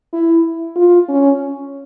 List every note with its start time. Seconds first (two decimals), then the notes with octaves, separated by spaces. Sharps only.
0.13 E4
0.76 F4
1.09 C#4